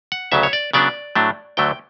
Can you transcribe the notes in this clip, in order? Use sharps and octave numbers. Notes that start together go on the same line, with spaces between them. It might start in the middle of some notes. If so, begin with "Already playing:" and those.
F#5
D2 C#3 F#3 E5
C#5
D5
C#3 F#3 B3 D4 D5
A2 F#3 A3 D4
D2 D3 F#3 A3 G5